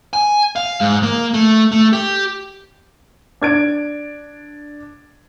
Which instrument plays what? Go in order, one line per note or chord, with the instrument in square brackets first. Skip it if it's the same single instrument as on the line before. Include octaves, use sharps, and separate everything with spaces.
[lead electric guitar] G#5
F5
G#2
A#3
A3
A3
G4
[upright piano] D4 G#6 D7